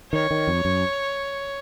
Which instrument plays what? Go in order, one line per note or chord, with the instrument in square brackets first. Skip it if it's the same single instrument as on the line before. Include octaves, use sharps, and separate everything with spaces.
[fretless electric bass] D#3 [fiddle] C#5
[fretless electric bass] D#3
F2
F#2